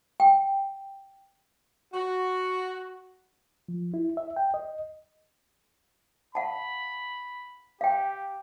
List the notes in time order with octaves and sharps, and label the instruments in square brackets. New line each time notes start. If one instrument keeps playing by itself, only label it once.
[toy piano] G5
[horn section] F#4
[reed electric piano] F3
E4
E5
G5
D#5
[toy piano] F5 F#5 A5 [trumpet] B5
[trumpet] G4 [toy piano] F5 G5